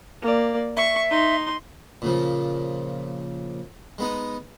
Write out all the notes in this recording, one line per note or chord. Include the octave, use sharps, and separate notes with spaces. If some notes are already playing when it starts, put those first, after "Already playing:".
A#3 D5
E5 C#6
D#4 C6
A#2 C#3 F3
G#3 B3 D#4